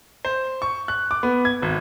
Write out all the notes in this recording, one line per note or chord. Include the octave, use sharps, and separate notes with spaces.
C5
C#6
F#6
D6
B3
G#6
G#1